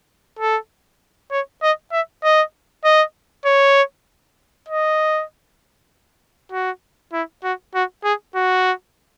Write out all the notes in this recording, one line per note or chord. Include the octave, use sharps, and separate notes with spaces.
A4
C#5
D#5
E5
D#5
D#5
C#5
D#5
F#4
E4
F#4
F#4
G#4
F#4